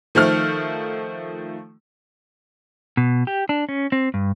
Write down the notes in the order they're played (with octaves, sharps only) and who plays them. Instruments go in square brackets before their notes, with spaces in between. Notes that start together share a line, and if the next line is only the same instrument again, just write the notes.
[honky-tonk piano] D#3 F3 A3 F6
[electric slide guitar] B2
G4
D4
C#4
C4
G2